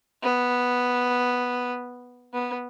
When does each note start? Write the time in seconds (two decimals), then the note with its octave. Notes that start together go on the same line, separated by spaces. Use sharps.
0.23 B3
2.33 B3